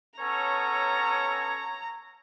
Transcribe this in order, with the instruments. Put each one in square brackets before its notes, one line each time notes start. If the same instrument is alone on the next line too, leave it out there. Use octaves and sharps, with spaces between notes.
[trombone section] B3 C#4 A4 [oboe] C#5 [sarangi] A#5